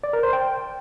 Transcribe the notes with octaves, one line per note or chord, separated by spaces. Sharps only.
D5
A#4
C5
G5